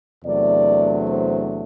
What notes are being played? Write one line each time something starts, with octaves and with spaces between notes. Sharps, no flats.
E2 C3 F#3 A3 D4 D5
C5